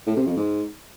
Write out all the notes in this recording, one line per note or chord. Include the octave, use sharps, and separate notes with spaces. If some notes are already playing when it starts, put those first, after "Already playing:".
A2
C3
F2
G#2